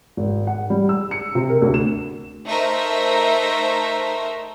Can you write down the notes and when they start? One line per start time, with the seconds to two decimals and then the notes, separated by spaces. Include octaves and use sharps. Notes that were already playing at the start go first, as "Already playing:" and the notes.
0.17 G#1
0.47 F#5
0.70 G3
0.89 E6
1.11 C#7
1.35 C3
1.50 A#4
1.62 D2
1.74 E7
2.46 A3 D#4 A#4 C5 E5